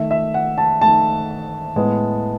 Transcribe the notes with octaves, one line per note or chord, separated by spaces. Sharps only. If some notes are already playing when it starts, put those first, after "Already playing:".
Already playing: D#3 A3 E5
E5
F#5
A5
D#3 A3 A5
A2 G#3 B3